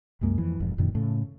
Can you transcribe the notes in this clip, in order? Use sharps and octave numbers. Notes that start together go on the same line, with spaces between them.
C2 F#2 G#3 A#3
F2 E3
E1 F2 G#2
F1 F#2 A#2 D#3
A2 C#3 A3